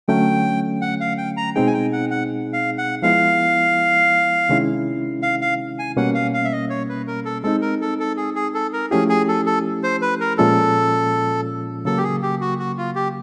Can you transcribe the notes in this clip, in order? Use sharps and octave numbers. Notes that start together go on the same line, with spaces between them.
D3 F#3 A3 C#4 G5
F#5
F5
G5
A#5
B2 G#3 C4 D#4 G#4 G5
G#5
G5
F#5
F#5
F5
F#5
F3 G#3 B3 E4 F5
C3 D#3 G#3 C#4 E4
F5
F5
G#5
B2 G3 A#3 C#4 F#5
F5
F5
E5
D#5
C#5
B4
A#4
A4
G#3 C4 D#4 A4
A#4
A4
A4
G#4
G#4
A4
A#4
F3 A3 C#4 E4 G4 G#4
G#4
A4
A4
C5
B4
A#4
A#2 F3 G#3 C#4 F4 A4
C#3 F#3 A#3 A4
G4
G#4
G4
F#4
F#4
F4
G4